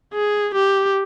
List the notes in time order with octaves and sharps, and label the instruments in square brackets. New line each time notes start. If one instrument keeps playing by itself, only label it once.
[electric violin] G#4
G4